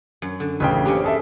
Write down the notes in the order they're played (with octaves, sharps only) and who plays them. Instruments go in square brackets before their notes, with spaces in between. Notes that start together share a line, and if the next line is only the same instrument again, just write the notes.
[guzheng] F#2
D3
[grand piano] A1 C#3 G5 [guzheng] B4 E5
[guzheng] A#3 C4 C#4 [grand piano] G4
[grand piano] G#4 A4 E5